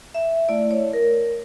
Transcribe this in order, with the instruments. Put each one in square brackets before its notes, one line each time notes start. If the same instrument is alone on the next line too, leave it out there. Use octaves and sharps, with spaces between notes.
[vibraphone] E5
A3 E4 D5
C#5
A#4